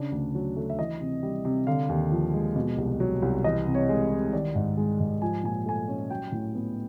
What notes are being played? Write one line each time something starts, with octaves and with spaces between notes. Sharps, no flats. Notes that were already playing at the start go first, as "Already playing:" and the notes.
Already playing: C#3 D4 D5
D2
F#3
A3
E5
E3 D#5
C3
G3
C3
D3 F5
D#2
F3
G#3
B2
C2
F#3
C2
E3 D#5
C3
C#5
G#3
C3
D#3 D5
G#2
G#3
G#2
F3 G#5
A#2 G#5
A3 G#5
C#4
F#3 G5
A2
B3